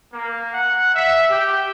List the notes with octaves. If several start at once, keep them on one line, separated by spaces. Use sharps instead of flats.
A#3
F#5
E5
G4